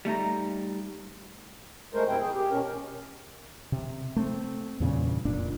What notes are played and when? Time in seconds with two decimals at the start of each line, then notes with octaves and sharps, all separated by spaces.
0.05 G3 A3 D#4 A#5
1.94 G#3 A3 A#4 C5
2.08 F#2 C3 C4 E4 G5
2.20 G#4
2.34 G4
2.50 B2 C#4 A#4
3.72 C3
4.16 A3 C4
4.80 E2 G2 A#2 C#3
5.25 F1 A#2 D4